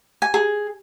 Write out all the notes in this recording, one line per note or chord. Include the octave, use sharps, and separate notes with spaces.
G#5
G#4